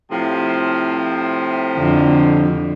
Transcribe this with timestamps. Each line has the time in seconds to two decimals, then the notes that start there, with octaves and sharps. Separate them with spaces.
0.11 A2 C3 F3
1.78 F2 D3